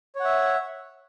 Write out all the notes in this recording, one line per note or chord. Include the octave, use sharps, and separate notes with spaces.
C#5 E5 F#5